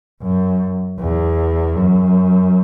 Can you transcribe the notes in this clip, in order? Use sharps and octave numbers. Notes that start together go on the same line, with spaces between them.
F#2
E2
F#2